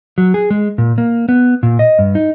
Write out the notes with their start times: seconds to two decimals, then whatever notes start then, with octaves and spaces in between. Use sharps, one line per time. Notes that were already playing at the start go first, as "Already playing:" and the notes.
0.18 F#3
0.34 G#4
0.51 G#3
0.78 A#2
0.98 A#3
1.29 B3
1.63 A#2
1.79 D#5
1.99 G2
2.15 D#4